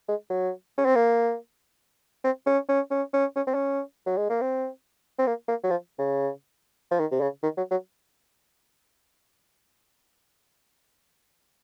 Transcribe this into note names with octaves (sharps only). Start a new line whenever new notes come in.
G#3
F#3
C#4
C4
A#3
C4
C#4
C#4
C#4
C#4
C#4
C4
C#4
F#3
G#3
A#3
C4
C4
A#3
A#3
F#3
F3
C#3
F3
D#3
C3
C#3
D#3
F#3
F#3